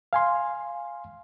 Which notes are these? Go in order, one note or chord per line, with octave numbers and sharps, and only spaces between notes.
F5 G#5 C6